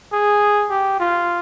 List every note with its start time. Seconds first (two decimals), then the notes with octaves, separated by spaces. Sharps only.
0.12 G#4
0.70 G4
1.00 F4